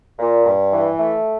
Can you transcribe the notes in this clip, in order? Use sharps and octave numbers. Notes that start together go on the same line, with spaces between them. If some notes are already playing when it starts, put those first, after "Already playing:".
A#2
G2
E3
A3